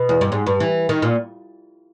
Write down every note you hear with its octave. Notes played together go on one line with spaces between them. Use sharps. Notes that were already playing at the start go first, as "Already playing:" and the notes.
Already playing: B2
E2
G2
G#2
G2
E3
D#3
A#2